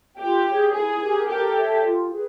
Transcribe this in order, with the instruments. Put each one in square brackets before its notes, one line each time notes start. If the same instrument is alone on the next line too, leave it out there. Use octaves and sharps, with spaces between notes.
[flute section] F4 [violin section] G4
[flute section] G#4 C#5
[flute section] E4 [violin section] G#4
[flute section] G4 A#4
[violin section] G4 A4 [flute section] A#4
[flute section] C#5 E5 A5
F4
G#4 B4